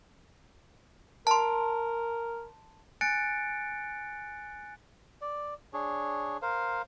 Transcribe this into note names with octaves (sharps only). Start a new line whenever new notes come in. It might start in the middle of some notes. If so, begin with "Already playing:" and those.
A#4 A5 C6
G#5 F#6 A6 C#7 D7
D5
D4 G#4 C#5
A#4 C5 F5